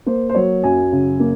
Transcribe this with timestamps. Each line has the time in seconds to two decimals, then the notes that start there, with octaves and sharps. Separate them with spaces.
0.06 A#3 C5
0.29 C5
0.35 F#3 C#5
0.64 F#2 G#5
0.92 C#3
1.20 A#3